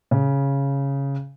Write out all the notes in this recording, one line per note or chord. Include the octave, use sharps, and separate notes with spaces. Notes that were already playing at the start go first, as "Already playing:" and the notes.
C#3